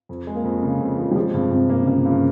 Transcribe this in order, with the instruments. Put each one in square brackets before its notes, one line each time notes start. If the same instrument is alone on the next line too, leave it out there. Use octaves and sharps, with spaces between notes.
[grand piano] F2
G#3
[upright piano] A#3
[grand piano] F2
C#3
F2
F3
[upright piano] G3
[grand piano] F3 [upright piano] G#3
[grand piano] G2 [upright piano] C3
[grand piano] G2 [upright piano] C3
[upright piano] C3 [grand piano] A#3
[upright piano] C#3 [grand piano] A#3
[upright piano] C3
[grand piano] G2 [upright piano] C#3